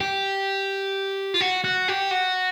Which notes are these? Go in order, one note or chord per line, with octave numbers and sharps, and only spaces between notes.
G4
F4
F#4
F#4
G4
F#4